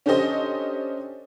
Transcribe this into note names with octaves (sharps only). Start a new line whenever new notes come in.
C#4 D4 G4 A4 C5 D#5